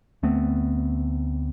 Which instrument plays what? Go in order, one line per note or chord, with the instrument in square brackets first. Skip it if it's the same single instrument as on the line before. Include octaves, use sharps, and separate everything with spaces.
[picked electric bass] D2 A3 B3 C4